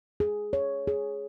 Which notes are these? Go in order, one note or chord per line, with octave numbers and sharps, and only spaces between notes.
G#4
C#5
G#4